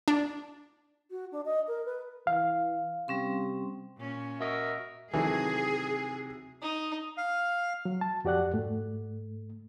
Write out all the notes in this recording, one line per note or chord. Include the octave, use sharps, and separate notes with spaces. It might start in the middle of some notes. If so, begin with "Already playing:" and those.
D4
F#4
D4
D#5
A#4
B4
E3 F5
C3 G3 C#4 C6
A#2 C#4
F#4 A#4 D#5 E5
C3 D#3 E3 F#3 A3 G#4
D#4
F5
F#3
A5
F2 F#4 G4 D5 F#5 F#6
G#2 A3